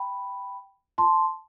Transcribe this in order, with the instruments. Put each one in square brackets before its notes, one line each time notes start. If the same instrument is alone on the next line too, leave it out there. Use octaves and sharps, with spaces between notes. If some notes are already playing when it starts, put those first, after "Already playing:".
Already playing: [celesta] G5 B5
A5 C6